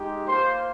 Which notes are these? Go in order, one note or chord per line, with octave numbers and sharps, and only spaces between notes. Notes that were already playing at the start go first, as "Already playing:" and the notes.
Already playing: G#3 D#4 G4
A#3 F4 C5